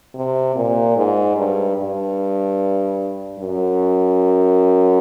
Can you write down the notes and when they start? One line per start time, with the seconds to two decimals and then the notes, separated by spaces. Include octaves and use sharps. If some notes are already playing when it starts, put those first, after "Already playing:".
0.15 C3
0.56 A#2
0.97 G#2
1.37 G2
1.78 G2
3.39 F#2